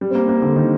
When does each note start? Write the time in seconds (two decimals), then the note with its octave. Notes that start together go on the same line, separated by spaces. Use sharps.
0.01 G3
0.11 C4
0.15 A#3
0.29 A#3
0.42 D3
0.56 D#3